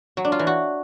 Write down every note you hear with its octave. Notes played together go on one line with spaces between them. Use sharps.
F#3
D4
F4
E3
F#4